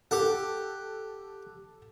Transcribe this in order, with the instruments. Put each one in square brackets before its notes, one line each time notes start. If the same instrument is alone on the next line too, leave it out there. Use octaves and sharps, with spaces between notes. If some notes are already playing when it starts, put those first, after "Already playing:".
[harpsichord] G4 F#5 [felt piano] A4